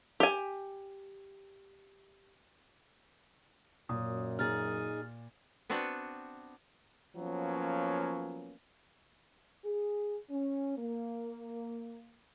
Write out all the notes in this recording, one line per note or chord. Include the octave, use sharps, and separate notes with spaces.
G4 G#5
F#2 A#2 D#6
D#4 G#4 F6 A6
B3 C4 D4 F#4 B4
F3 F#3 A#3 B3 C#4
G#4
C#4
A#3